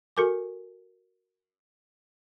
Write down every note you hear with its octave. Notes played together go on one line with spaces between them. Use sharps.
F#4 A4 A#4 G#5 D6